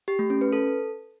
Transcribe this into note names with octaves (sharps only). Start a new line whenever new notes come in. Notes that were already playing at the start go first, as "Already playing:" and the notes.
G4
A3
C#4
B4
A4